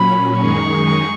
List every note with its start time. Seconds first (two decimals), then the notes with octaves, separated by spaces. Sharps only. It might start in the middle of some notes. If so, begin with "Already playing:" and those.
Already playing: A#2 F#3 C#4 B5
0.40 F#2 D#3 G#3 D#4 G#4 C#6